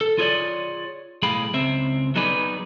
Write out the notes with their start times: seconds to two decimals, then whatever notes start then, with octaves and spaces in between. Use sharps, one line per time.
0.01 A4
0.18 F4 G#4 B4 C#5 D5
1.23 B1 A2 G#4 F5 G5 B5
1.54 C#2 C4 E5
2.16 F#3 B3 D#4 G#4 B4 D5